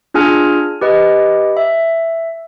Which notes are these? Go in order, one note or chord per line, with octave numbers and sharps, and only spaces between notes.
D4 F4 G#4 G#5 F6
G4 B4 D#5
E5